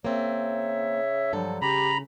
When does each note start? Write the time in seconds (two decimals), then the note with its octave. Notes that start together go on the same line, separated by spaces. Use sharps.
0.05 C#3 A#3 C4 C#5 E5
1.33 G2 D3 F3 F#3 A4
1.62 C#3 G4 A#5 B5